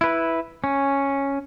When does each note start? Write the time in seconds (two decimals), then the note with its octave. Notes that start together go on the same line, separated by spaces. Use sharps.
0.01 E4 B4
0.64 C#4